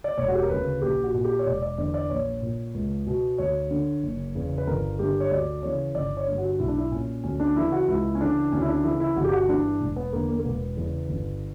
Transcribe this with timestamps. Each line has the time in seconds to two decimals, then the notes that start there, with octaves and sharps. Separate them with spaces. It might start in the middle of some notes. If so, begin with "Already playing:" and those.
0.04 D5
0.18 E1 C#5
0.28 F#4
0.35 G4
0.42 A#4
0.49 D2 C#3 B4
0.82 A#1 G4
1.03 F#4
1.14 A#2
1.24 G4
1.39 C#5
1.46 E1 D5
1.62 D5
1.78 E2 D3 D5
1.94 D5
2.10 A#1 C#5
2.42 A#2
2.74 C#2
3.06 B2
3.38 D2 C#5
3.71 D3
4.03 F#1
4.35 E2 C#3
4.58 B4
4.67 G1 A#4
4.99 G2 D3 G4
5.20 C#5
5.31 D2 D5
5.63 C#3 E3 C#5
5.95 G1 D5
6.17 C#5
6.28 G2 D3
6.38 F#4
6.59 B1 E4
6.68 D4
6.77 E4
6.92 A#2 C#4
7.24 D2 C#4
7.40 D4
7.56 C#3 E3 E4
7.72 F#4
7.88 C#2 E4
8.15 C#4
8.20 C#3 E3 D4
8.52 D2 C#4
8.62 E4
8.68 D4
8.84 C#3 E3 E4
9.00 E4
9.16 G1 F#4
9.24 G4
9.32 F#4
9.48 G2 E3 D4
9.81 E1
9.96 B3
10.13 E2 D3 A#3
10.29 A#3
10.39 A#3
10.45 E1 B3
10.77 E2 C#3 E3
11.09 G1